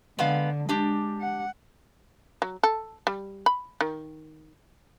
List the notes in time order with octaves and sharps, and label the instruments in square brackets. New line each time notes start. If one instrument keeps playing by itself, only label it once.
[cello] D3 [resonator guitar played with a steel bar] G#3 B3 F5
[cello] G#3 [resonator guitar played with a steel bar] D4 G4
[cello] F#5
[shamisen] F#3
A4
G3
B5
D#3